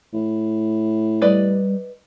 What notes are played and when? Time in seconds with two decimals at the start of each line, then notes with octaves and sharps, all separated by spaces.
0.13 A2
1.22 G3 B4 D5 D#5